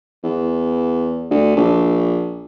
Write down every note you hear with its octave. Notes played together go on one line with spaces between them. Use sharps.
E2
D2
A#1